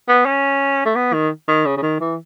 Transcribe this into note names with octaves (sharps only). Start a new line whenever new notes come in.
B3
C#4
A3
B3
D#3
D#3
C#3
C#3
D#3
E3